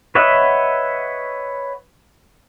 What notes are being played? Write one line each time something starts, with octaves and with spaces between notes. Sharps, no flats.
B4 C#5 D#5 E5 F#5